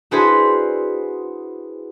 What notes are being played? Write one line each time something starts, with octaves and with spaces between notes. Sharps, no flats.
D4 E4 F#4 G#4 B4 C5